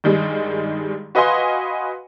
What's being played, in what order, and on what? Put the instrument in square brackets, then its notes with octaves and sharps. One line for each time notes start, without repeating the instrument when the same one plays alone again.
[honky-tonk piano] G2 D#3 G3 G#3
F#4 B4 D#5 F5 G#5 C6